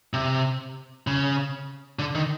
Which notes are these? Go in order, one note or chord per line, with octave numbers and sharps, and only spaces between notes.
C3
C#3
D3
D#3